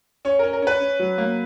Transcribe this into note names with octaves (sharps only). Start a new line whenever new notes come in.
C#4 C#5
C#4 A#4
A#4
C#4 B4
C#4
F#3
A#3